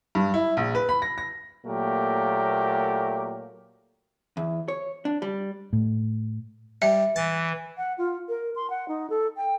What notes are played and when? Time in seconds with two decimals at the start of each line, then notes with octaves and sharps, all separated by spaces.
0.15 G2
0.34 E4
0.57 A#1
0.75 B4
0.89 B5
1.02 A#6
1.18 A#6
1.66 A#2 F#3 A3 A#3 G4 A#4
4.37 E2
4.68 C#5
5.05 D4
5.22 G3
5.73 A2
6.82 G3 E5
7.16 E3 A5
7.78 F#5
7.98 F4
8.29 A#4
8.56 C6
8.70 F#5
8.88 D#4
9.10 A4
9.37 G5